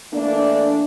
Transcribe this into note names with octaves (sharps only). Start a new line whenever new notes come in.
E3 A3 A#3 D4